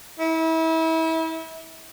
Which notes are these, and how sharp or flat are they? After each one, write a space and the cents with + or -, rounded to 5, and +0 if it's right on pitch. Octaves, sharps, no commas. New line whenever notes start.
E4 -30